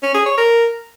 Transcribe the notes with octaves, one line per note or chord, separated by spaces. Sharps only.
C#4
G#4
C#5
A#4